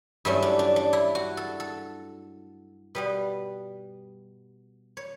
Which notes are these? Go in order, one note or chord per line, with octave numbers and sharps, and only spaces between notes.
G2 F#3 A3 C#4 E4
D4
D4
D4
E4
F#4
A4
A4
B2 G3 B3 B4
C#5